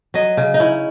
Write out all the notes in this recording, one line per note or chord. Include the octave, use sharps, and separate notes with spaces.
F#3 D#5
C#3
D#4
C#4 E4